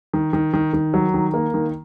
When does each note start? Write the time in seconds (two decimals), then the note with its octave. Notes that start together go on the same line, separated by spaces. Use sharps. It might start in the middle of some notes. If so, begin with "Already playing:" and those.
0.13 D#3
0.33 D#3
0.54 D#3
0.73 D#3
0.94 F#3
1.14 D#3
1.34 A#3
1.54 D#3